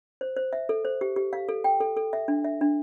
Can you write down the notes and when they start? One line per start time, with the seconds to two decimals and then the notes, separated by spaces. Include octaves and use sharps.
0.21 C5
0.37 C5
0.53 E5
0.69 A4
0.85 C5
1.01 G4
1.16 G4
1.33 F5
1.49 A4
1.64 G5
1.80 A4
1.97 A4
2.13 E5
2.28 D4
2.44 E5
2.61 D4